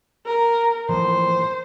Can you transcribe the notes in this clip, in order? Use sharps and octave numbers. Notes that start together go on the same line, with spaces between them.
A#4
A2 E3 F3 C5